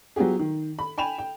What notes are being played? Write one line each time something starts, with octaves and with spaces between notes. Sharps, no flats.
F#3 B3 F4 G4 G#4
D#3
B5
G5 G#5 B5 E7 F7
G5